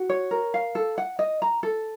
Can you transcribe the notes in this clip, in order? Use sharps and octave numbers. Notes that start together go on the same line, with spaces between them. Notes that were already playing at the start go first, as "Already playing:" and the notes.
Already playing: F#4
C#5
A#4
F5
A4
F#5
D#5
A#5
A4